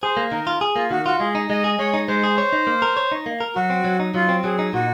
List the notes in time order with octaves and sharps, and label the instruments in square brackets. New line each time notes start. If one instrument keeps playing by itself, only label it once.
[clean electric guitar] G#4 [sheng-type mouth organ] C5
[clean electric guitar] A#3
[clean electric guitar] D#3 [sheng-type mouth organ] A#4
[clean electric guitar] F4
G#4
[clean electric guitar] A#3 [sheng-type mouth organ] F4
[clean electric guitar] D#3 [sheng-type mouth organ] F#4
[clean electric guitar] F4 [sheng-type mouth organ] F#4
[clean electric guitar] G#3 [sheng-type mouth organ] G#4
[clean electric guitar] D#4
[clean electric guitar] G#3 [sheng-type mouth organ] D#5
[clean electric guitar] G#4
[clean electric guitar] G#3 [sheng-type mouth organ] C#5
[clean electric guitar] D#4
[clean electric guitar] G#3 [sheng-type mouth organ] C5
[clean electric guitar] G#4
C#5
D#4
A#3
A#4
C#5
D#4
A#3
A#4
[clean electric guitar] F#3 [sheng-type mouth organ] F#4
[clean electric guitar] C4
F#3
D#4
[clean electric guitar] F#3 [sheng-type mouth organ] F4
[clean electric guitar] C4
[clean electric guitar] F#3 [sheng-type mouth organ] G#4
[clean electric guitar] D#4
[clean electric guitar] A#2 [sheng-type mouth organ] F#4